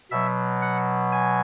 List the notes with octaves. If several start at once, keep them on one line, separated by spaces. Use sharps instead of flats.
B2 F#3 E5
F#5
G#5